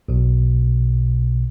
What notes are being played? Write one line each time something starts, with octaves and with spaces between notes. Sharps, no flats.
B1 B2